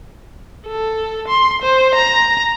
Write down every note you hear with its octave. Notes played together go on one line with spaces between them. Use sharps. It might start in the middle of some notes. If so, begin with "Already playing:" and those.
A4
C6
C5
A#5